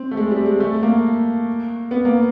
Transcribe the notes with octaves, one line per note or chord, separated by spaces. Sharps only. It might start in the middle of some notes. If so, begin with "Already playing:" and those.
Already playing: C4
A3
G#3
G3
G#3
A3
A#3
B3
A#3